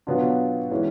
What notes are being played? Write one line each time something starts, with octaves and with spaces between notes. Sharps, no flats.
B2 F#3 B3 D4 F4
E3 G#3 C#4 F#4